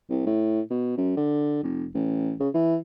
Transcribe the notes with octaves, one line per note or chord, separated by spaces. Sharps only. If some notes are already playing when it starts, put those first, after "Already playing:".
C2
A2
B2
F#2
D3
F1
A1
C#3
E3